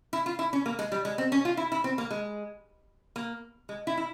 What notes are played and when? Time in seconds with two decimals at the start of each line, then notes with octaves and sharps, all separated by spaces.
0.13 E4
0.26 F4
0.39 E4
0.53 C#4
0.66 A#3
0.79 G#3
0.92 G3
1.05 G#3
1.18 C4
1.32 C#4
1.45 F4
1.57 E4
1.72 E4
1.84 C4
1.98 A#3
2.11 G#3
3.16 A#3
3.69 G#3
3.87 E4
3.98 E4